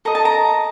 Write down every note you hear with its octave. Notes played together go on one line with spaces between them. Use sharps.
A4 D#5 A#5
A5
A#5